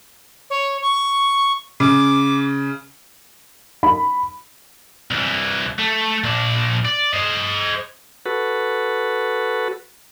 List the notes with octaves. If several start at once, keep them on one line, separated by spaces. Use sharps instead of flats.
C#5
C#6
C#3 D6
B5
C2 E3
A3
A#2 D4
D5
C5 D#5
F#4 A4 B4